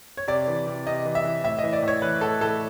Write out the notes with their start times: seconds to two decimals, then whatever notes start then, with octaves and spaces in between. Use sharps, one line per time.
0.17 C#5
0.28 C3 D5
0.47 E3
0.67 C3
0.87 C3 D#5
1.05 E3
1.15 E5
1.24 E3
1.44 A2 E5
1.59 E3 D#5
1.73 D5
1.82 A2
1.88 C#5
2.02 E3 B4
2.21 A2 A4
2.41 A2 A4